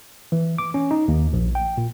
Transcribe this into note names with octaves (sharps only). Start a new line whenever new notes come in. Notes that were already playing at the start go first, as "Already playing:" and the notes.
E3
D6
C#4
D#4
D#2
A#1
G5
A#2